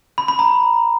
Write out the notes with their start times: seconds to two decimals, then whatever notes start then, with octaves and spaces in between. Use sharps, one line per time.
0.18 B5
0.28 B5
0.39 A#5